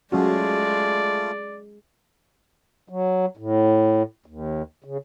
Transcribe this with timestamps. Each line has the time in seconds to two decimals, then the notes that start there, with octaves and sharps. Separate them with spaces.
0.12 F#3 G#3 A3 C#4 F4 F#4 D5
2.89 F#3
3.37 A2
4.26 D#2
4.84 C#3